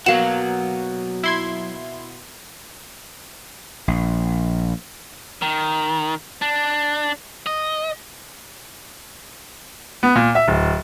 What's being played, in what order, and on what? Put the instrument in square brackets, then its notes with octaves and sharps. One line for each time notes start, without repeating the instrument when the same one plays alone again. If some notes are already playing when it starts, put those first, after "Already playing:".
[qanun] B2 A#3 [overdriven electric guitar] F#3 F#5 [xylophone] F5 E7
[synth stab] E4 C6 G#6
[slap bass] A#1
[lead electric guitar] D#3
D4
D#5
[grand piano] B3
A#2
E5
D1